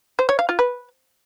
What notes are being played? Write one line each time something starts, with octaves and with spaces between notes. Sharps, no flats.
C5
C#5
F5
F4
B4